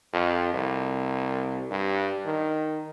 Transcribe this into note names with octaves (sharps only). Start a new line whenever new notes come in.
F2
C2
G2
D#3